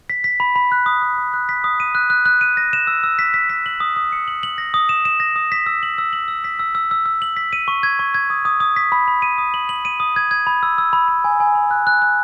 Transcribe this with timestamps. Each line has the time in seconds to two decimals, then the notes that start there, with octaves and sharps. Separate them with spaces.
0.10 B6
0.24 B6
0.40 B5
0.56 B5
0.72 F#6
0.86 D#6
1.02 D#6
1.18 D#6
1.34 F#6
1.49 B6
1.64 D#6
1.80 D#7
1.95 F#6
2.10 F#6
2.26 F#6
2.41 D#7
2.57 A#6
2.73 E7
2.87 E6
3.04 E6
3.19 B6
3.34 B6
3.50 B6
3.66 F#7
3.80 D#6
3.96 D#6
4.12 C#7
4.28 F#7
4.43 F#7
4.58 A#6
4.74 D#6
4.89 E7
5.05 E7
5.20 A#6
5.36 D#6
5.52 B6
5.66 E6
5.83 F#7
5.98 E6
6.13 F#7
6.28 E6
6.44 B6
6.59 E6
6.75 E6
6.91 E6
7.06 E6
7.22 F#7
7.37 B6
7.53 D#7
7.68 C#6
7.83 G#6
7.99 C#6
8.14 G#6
8.30 D#6
8.45 D#6
8.60 D#6
8.76 B6
8.92 B5
9.08 B5
9.22 D#7
9.38 D#6
9.54 F#7
9.69 F#7
9.85 D#7
10.00 D#6
10.16 G#6
10.31 G#6
10.47 B5
10.63 E6
10.78 E6
10.93 B5
11.08 B5
11.24 G#5
11.40 G#5
11.55 B5
11.71 F#6
11.87 F#6
12.02 F#6